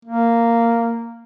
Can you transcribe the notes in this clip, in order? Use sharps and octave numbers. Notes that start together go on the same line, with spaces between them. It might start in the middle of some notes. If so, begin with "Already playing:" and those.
A#3